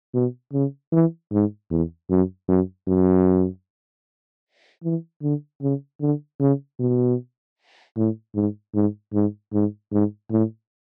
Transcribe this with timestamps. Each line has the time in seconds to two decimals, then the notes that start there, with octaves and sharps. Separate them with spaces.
0.14 B2
0.53 C#3
0.92 E3
1.32 G#2
1.70 E2
2.10 F#2
2.48 F#2
2.88 F#2
4.84 E3
5.22 D3
5.61 C#3
6.00 D3
6.40 C#3
6.79 B2
7.96 A2
8.35 G#2
8.74 G#2
9.13 G#2
9.53 G#2
9.92 G#2
10.31 A2